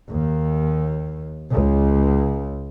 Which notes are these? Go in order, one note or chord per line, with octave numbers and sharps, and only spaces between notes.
D#2
C#2